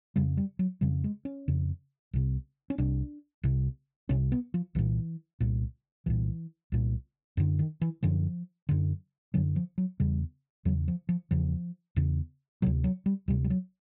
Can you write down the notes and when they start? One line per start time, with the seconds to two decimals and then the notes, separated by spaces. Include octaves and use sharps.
0.16 F2 C#3 G3
0.37 G3
0.59 F#3
0.81 F2 C#3 G3
1.04 G#3
1.25 C#4
1.48 F2 C#3
2.13 C2 C3
2.70 C#4
2.78 C2 C3 D4
3.43 C2 C3
4.09 C2 C3 C#4
4.32 B3
4.54 F3
4.75 C2 A#2 E3
5.40 C2 A#2
6.06 C2 A#2 E3
6.72 C2 A#2
7.37 F#2 D3
7.59 D#3
7.81 E3
8.03 F#2 D3 F3
8.69 F#2 D3
9.34 F#2 D3 F#3
9.56 F3
9.78 F#3
10.00 E2 C#3 G3
10.65 E2 C#3 F#3
10.88 F3
11.09 F3
11.31 E2 C#3 F3
11.96 E2 C#3
12.62 D2 C3 F#3
12.84 F#3
13.06 G3
13.28 D2 C3 G3
13.44 G3
13.50 F#3